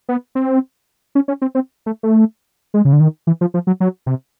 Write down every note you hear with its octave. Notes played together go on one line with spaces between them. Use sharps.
B3
C4
C#4
C#4
C4
C4
A3
A3
G#3
C#3
D3
D#3
E3
F3
F3
F#3
F#3
C3